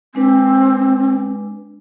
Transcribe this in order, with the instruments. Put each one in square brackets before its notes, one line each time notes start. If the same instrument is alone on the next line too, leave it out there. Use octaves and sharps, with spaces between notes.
[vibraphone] G#3 D4 B4 [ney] C4